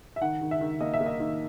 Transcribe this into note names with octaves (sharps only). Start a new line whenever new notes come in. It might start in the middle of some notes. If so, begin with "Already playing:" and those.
E5
D#3 F#5
D#3
E5
D#3
A#3 D#5
E5
A#3
D#5
D#3